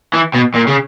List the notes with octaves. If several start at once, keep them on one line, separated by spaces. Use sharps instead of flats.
E3
B2
A#2
C#3